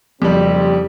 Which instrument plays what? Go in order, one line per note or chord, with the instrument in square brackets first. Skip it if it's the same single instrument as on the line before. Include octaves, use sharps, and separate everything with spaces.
[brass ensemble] F#1 C4 G4 [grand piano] F2 G3